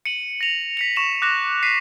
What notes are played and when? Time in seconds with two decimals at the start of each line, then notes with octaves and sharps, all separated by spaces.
0.05 C#7 D#7 F#7
0.41 A#6 F7
0.77 B6 C#7 F7
0.96 C#6 E7 F7
1.22 D6 F#6 A#6 E7 F7
1.63 B6 C7 D#7